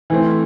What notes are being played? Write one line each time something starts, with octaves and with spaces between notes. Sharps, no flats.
E3 A3 C4